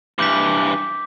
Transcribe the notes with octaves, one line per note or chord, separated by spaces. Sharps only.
G2 E3 D6 G6 B6